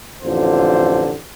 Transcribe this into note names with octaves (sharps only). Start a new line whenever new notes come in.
A1 F2 D3 F4 C5